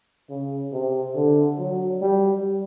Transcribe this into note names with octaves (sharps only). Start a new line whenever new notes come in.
C#3
C3
D3
F#3
G3